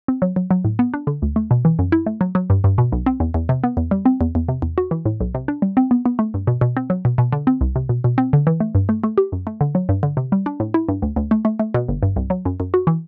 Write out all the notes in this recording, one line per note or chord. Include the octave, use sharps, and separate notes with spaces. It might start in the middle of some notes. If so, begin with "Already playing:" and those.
C4
F#3
F#3
F#3
A2
B3
D4
D3
D2
A3
B2
E3
F#2
E4
A3
F#3
F#3
G2
G2
B2
B1
C4
E2
E2
C3
B3
E2
G3
C4
E2
E2
C3
E2
F#4
E3
A2
B1
C3
D4
G3
C4
B3
B3
A3
G2
B2
B2
C4
F#3
B2
B2
D3
C4
C2
C3
B2
B2
C4
D3
E3
A3
G2
A3
A3
G4
F#2
A3
D3
F#3
G2
D3
C3
G3
D4
A2
E4
G2
D2
D2
A3
A3
A3
B2
G1
G2
C2
F#3
F#2
F#2
F#4
E3